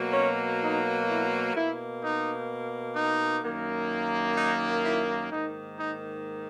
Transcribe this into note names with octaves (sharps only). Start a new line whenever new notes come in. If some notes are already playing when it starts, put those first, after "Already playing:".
Already playing: B2 F#3 A#3
C#4
D#4
E4
B2 A#3 E4
D#4
D#4
F#2 D#3 A#3
D#4
E4
G#2 D#3 A#3 D#4
D#4